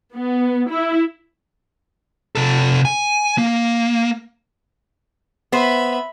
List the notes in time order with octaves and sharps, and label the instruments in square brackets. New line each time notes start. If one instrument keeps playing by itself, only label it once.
[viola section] B3
E4
[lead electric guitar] C3 A4
G#5
A#3
[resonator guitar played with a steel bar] B3 C5 [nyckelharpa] E5 B5